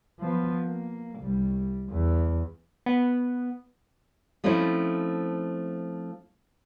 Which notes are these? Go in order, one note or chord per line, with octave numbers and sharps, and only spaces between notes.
F3 B3
A#3
C2 G3
E2
B3
F3 A3 C4 C#4 D#4 E4